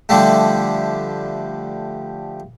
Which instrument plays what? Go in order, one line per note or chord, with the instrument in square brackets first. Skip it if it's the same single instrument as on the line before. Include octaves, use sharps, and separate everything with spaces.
[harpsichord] D3 F3 G3 A3